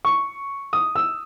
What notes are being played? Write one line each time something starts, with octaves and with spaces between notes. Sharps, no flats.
C#6
D#6
E6